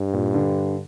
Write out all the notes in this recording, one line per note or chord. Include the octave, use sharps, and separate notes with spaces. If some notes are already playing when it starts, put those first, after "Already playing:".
Already playing: G2
A#2
D3